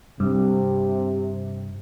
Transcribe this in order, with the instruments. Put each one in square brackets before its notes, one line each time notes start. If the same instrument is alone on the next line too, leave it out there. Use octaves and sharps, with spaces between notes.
[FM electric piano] G2 [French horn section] C3